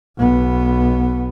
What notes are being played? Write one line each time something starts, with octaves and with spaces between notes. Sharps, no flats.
B1 B3